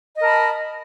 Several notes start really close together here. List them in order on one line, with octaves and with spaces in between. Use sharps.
D#5 A#4 A5 B5